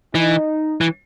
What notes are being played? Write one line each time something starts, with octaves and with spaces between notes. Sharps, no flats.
E3 D#4
E3